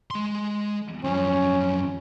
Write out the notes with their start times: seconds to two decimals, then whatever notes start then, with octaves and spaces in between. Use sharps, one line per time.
0.11 G#3 C6
1.04 F#2 F3 C#4